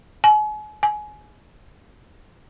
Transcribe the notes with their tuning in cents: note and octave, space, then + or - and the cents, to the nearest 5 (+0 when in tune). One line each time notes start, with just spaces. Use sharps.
G#5 +40
G#5 +20